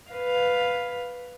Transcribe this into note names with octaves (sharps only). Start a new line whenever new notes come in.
B4 F5